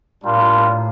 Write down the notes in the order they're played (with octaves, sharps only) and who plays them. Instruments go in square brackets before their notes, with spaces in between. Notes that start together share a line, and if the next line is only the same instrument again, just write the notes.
[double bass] A2 [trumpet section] G3 D4 F4 A#4